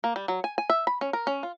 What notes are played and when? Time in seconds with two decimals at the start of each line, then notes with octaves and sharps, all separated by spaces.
0.04 A#3
0.16 G3
0.28 F#3
0.44 G#5
0.58 G#5
0.70 E5
0.87 B5
1.01 C#4
1.13 A#4
1.27 C#4
1.43 F4